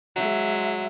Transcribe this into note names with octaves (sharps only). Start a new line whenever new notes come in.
F#3 G#3 E5